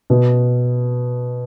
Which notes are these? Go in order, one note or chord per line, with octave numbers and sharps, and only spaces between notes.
B2